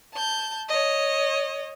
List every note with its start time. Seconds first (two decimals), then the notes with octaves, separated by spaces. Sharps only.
0.14 A5 G6
0.69 C#5 D#5